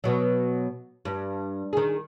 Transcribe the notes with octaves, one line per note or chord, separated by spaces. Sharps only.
B2 F#3
G2
D#3 G#4